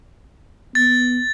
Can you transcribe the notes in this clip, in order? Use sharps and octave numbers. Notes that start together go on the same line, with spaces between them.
B3 A6